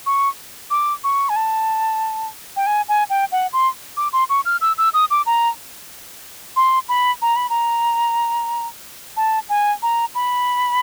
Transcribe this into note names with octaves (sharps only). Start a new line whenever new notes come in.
C#6
D6
C#6
G#5
A5
G5
G#5
G#5
G5
F#5
C6
D6
C6
C#6
F6
E6
E6
D#6
D6
A#5
C6
B5
A#5
B5
A#5
A5
G#5
A#5
B5